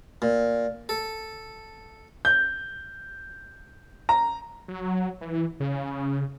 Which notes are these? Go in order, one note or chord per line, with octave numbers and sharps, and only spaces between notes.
A#2
A4
G6
A#5
F#3
E3
C#3